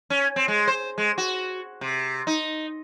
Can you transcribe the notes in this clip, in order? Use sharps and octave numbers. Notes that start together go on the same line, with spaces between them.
C#4
C4
G#3
C5
G#3
F#4
C3
D#4